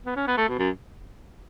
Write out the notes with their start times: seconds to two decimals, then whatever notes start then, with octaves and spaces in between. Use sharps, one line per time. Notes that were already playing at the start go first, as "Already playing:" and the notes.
0.06 B3
0.16 C#4
0.28 B3
0.37 A3
0.48 B2
0.59 F#2